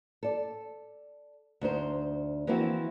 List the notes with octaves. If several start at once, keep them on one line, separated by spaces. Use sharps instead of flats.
A4 D5
D2 D4 D#4 C5
E3 F3 A#3 C4 E4 F#4